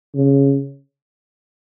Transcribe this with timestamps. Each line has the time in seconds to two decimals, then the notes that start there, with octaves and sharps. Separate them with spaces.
0.15 C#3